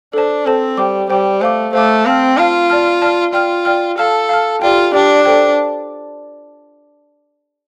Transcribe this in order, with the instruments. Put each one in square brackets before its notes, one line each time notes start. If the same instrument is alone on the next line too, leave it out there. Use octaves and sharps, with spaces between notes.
[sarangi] D4 [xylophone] A4 C5 A5
[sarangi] C4 [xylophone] A4 C5 A5
[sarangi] G3 [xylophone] C5 G5 D6
[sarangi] G3 [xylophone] C5 G5 D6
[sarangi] A3 [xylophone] C5 F5 D6
[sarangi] A3 [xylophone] C5 F5 D6
[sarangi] C4 [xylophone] F5 A5 F6
[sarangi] F4 [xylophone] F5 A5 F6
[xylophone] D5 A5 F6
D5 A5 F6
[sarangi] F4 [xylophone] D5 G5 F6
[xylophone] D5 G5 F6
[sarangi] A4 [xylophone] F5 A5 F6
[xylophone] F5 A5 F6
[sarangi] F4 [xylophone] G4 D5 G5
[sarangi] D4 [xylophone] G4 D5 G5
[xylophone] A4 C5 G5